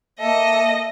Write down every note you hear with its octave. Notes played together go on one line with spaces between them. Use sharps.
A#3 A4 D#5 E5